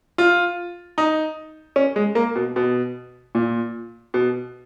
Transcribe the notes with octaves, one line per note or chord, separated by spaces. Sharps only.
F4
D#4
C#4
G#3
A#3
B2
B2
A#2
B2